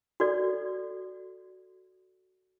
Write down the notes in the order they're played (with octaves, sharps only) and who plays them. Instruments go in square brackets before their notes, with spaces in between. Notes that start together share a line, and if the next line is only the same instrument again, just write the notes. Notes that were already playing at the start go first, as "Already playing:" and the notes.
[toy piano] F#4 A4 D5